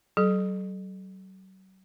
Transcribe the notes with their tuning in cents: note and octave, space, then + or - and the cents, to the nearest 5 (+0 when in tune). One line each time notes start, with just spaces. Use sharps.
F#3 +40 A4 -35